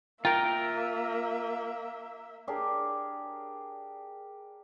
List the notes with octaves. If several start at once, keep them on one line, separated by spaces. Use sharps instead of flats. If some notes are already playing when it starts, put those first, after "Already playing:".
A#3 F4 A#4 E5 G5 A#5
D4 G4 G#4 A#4